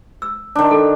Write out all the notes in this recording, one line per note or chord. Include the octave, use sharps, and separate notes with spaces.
E6
D#3 D4
A4